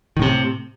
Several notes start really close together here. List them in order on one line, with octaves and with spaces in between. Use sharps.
D#3 A2 C3